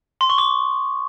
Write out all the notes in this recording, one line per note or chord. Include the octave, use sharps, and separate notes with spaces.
C6
C#6
D6